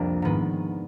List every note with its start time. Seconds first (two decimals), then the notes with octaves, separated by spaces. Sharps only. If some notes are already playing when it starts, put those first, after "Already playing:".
Already playing: C2 F2 C3 F3 A#3 D4
0.22 G#2 D#3 G#3 B3